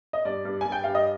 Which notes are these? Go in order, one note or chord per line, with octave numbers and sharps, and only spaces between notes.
D#5
G2 D5
G2
G2 G#5
G5
G2 F5
D#5